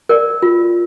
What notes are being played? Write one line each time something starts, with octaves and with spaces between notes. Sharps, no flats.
A#4 D5
F4